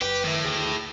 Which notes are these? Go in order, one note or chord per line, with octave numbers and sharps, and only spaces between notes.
F#1 G4 B4
A2 D#3 E4
D2 G#4 G5